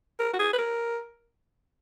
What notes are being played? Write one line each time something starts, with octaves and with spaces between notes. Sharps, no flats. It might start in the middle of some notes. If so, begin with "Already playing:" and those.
A#4
F#4
G#4
B4
A#4